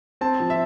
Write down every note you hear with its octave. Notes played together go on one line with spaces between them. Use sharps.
C4 A5
F3
E5